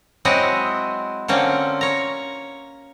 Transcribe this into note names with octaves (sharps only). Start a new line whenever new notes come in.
F#3 G#3 C4 E4 F#4 D#5
D3 A#3 C4 C#4
C#5 A#5